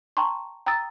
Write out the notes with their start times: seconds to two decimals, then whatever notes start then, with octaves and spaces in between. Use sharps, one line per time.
0.17 G5 A5 A#5 C6 C#6
0.66 G5 A#5 D#6 E6 A6